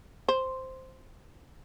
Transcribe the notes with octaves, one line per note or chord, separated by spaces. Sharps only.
C5